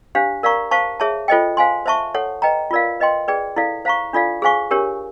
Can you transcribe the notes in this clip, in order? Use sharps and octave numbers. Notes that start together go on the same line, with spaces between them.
D4 G4 C5 F5
A#4 D5 F5 A#5 C#6
C5 F5 A5 C#6
G#4 C#5 E5 A5
F4 A4 C5 D#5 G5
C5 F5 G#5 C6
C5 E5 A5 C#6
A4 C#5 F#5
B4 D#5 G5 A#5
F4 A#4 D5 F5
B4 D#5 G5 C6
G#4 B4 D5 G5
E4 A4 D5 F5
C5 F5 A#5 C#6
D4 F4 A4 D5 F5
G#4 C5 F5 G#5 C#6
D4 G4 A#4 C#5